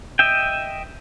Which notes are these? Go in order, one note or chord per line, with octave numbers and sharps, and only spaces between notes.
D#5 E5 G5